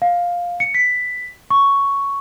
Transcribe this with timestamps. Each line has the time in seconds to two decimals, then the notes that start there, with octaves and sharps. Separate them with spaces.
0.02 F5
0.60 C#7
0.74 B6
1.50 C#6